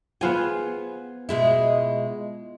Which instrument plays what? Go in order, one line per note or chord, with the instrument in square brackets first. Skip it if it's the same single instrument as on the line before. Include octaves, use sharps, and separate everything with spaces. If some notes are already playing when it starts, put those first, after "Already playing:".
[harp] B3 F4 G#5 [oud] G#4 C5
[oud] B2 G#3 E4